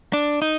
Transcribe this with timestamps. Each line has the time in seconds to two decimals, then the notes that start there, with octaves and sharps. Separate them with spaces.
0.13 D4
0.42 D#4